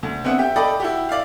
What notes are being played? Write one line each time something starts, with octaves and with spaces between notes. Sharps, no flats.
D2
B3 C4 D4 E5 F#5
G4 E5 G5
A4 D5 D#5 G5 B5
E4 F#4 G4
D5 E5 F5